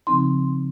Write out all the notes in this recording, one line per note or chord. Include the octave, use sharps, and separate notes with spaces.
C#3 F3 C4 D#4 C6